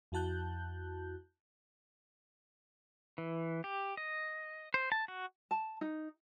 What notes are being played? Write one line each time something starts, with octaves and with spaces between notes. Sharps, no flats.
F2 E4 F#4 A5 F#6 G6
E3
G4
D#5
C5
A5
F#4
A5
D#4